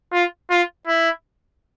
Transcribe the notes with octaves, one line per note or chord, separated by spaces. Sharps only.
F4
F4
E4